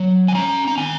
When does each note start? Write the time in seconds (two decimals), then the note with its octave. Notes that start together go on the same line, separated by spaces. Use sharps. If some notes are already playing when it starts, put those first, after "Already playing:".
Already playing: F#3
0.28 G#5
0.35 C#4 A#5
0.67 A#5
0.78 D#3 G#5